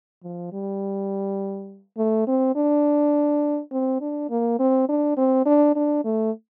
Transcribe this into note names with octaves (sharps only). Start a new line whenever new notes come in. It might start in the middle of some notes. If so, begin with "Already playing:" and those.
F3
G3
A3
C4
D4
C4
D4
A#3
C4
D4
C4
D4
D4
A3